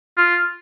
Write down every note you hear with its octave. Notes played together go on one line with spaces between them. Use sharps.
F4